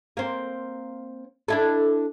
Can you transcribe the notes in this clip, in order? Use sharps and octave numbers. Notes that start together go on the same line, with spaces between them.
A#3 C4
D4 E4 A4